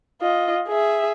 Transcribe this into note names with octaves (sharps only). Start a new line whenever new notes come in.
F4 D#5
G#4 E5